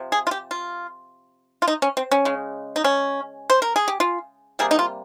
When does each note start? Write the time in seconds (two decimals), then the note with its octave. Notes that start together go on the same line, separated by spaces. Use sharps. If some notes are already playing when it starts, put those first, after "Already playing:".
Already playing: C3 F3
0.12 G#4
0.27 F4
0.31 G4
0.51 F4
1.62 F4
1.68 D#4
1.82 C#4
1.97 C4
2.11 C#4
2.25 C#3 G#3
2.76 D#4
2.84 C#4
3.50 C5
3.62 A#4
3.76 G#4
3.88 G4
4.00 F4
4.59 C3 G3 A#3 G#4
4.71 D#4
4.79 F4